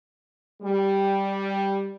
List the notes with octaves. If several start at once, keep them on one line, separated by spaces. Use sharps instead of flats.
G3